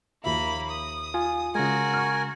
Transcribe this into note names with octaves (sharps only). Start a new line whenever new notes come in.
D#2 F3 A#3 E5 B5
D#6
F4 G#5
C#3 G#3 F#4 A#4 G#5
C#6 F6